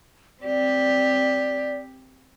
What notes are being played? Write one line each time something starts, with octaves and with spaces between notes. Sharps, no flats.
C4 G4 D5